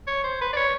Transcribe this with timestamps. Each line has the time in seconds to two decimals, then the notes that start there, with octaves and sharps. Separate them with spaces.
0.07 C#5
0.24 C5
0.41 B4
0.53 D5
0.57 C#5